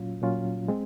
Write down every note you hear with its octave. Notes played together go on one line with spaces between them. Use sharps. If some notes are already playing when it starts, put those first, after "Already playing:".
Already playing: A#2 F#3 C#4 F4
A#2 F#3 C#4 F4
G#3 C4